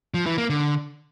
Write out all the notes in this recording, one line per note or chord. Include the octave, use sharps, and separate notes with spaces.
F3
E3
A#3
D3